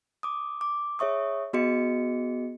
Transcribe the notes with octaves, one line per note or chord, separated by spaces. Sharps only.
D6 D#6
D6
G#4 C#5 E5 C#6 D#6
B3 F#4 G#4 D#5 C#7